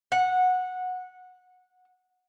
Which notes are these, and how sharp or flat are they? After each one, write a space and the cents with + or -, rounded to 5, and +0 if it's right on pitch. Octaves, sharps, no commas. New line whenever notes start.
F#5 -15